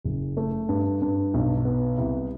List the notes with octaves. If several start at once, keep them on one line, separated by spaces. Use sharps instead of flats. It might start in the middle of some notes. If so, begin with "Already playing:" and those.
F#1
A3
G2
G2
B1
B3
C2